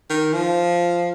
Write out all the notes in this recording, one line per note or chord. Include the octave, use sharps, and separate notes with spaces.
D#3
F3